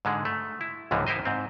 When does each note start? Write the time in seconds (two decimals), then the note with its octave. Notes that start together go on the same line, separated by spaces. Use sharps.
0.05 G#2 D3 G#3
0.25 A3
0.61 E4
0.91 C#2 G#2 D3 E3 F3 A#3
1.07 D#4 E4 A#4 C5 D#5
1.25 G#2 C4